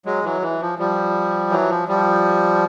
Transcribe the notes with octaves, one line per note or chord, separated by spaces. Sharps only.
F#3 G#3
E3 F#3
E3
F3
F3 G3
E3 F#3
F3
F3 G3